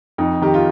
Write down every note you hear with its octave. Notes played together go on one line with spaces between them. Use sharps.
F2 D#4
D#3 G4
F4